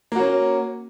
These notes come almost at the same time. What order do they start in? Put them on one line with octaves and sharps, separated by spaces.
A#3 F#4 C#4